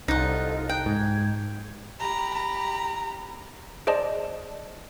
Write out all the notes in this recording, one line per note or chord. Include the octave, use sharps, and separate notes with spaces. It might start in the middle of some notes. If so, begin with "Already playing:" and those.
C2 D#4 F4 A4 D#5 F#5
D#4 G5 A5 F#6
G#2 G#6
G4 A#5 B5
A#5
G#4 C5 D5 D#5 A5